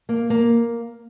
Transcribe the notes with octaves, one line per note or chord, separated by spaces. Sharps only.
A#3
A#3